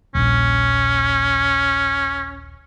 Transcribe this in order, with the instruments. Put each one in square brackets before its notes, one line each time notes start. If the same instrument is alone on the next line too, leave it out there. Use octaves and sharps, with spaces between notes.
[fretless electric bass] D#1 A#1 [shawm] C#4